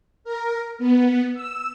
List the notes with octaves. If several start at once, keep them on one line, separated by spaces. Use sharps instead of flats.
A#4
B3
E6